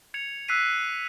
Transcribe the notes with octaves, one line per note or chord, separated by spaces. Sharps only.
G#6 C#7 F7
E6 F#6 B6 C7 D#7